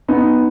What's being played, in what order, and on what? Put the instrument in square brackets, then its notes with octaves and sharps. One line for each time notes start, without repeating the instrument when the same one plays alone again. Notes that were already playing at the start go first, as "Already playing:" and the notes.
[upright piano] B3 D#4